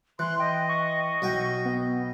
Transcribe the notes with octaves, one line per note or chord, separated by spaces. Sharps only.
E3 C6 F#6
D#5 G5
C#6
B1 F#5 G5
B3